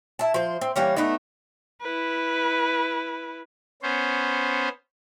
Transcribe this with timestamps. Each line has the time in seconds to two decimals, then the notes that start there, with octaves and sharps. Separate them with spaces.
0.19 E4 A5
0.34 F3 C5
0.61 C4
0.76 E3 G3 A#3 C#4
0.97 A3 B3 D4 D#4
1.81 E4 B4
3.83 B3 C#4 C5